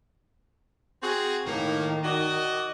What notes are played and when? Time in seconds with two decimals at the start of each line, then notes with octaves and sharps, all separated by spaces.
1.02 C4 F#4 G#4
1.46 A2 D#3 A#3
2.04 F#4 D5 D#5